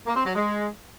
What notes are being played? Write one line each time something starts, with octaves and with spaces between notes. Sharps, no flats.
A#3
C4
F#3
G#3